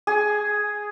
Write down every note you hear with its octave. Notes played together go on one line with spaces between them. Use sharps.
G#4